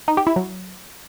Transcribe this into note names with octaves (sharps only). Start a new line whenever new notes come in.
D#4
G4
E4
F#3